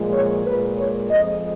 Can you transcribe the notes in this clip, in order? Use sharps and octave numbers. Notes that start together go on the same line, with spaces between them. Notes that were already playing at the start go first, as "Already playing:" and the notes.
Already playing: A#2 F3 G#3
C#5
A#2 G#3 B4
C#5
F2 F3 G#3 D#5